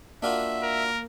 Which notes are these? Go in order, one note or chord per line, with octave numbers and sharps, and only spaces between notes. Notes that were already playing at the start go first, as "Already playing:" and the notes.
A#3 D4 F4 F#4 E5
A#4